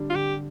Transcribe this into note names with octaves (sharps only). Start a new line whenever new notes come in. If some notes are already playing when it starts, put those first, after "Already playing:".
Already playing: D3 G3 D4
F4
D3 G4